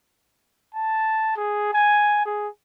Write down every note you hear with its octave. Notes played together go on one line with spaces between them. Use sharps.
A5
G#4
G#5
G#4